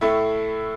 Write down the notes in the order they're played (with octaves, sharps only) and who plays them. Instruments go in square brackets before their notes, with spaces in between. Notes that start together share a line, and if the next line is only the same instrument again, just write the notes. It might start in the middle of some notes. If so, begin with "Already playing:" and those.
[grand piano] A2 A3 E4